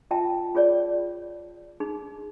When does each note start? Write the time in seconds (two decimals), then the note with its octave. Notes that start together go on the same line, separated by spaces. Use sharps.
0.11 F4 E5 G5 A5
0.55 F4 G#4 C#5 D5
1.80 D#4 G#4